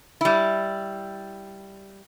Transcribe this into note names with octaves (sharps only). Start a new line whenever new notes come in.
G3 E4